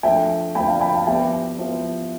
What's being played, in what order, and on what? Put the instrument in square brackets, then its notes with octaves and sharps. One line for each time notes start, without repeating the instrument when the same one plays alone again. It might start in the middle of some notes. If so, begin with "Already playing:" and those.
[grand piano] F3 A3 D4 [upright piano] E5 G5
[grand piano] F3 A3 D4 [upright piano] G5 B5
[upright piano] F5 A5
G5 B5
F5 A5
[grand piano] F3 B3 E4 G4 C5 [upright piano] E5 G5
[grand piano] F3 B3 E4 G4 C5